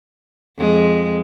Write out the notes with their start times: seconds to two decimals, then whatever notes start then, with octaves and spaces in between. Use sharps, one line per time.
0.57 F2 G#3